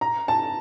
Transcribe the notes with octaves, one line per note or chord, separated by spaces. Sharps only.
A#5
A5